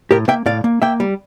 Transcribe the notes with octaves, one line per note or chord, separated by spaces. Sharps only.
A2 G4 A#4
A#3 E5 G5
A2 D5 F5
A#3
A#3 E5 G5
G3